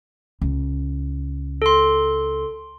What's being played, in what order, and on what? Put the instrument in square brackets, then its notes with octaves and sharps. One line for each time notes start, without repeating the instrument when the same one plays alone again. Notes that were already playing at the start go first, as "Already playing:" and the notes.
[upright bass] C#2
[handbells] A4 C6